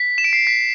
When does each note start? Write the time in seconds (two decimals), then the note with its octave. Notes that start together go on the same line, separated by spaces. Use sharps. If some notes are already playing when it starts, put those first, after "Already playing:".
Already playing: B6
0.18 E7
0.24 D7
0.33 C7
0.47 B6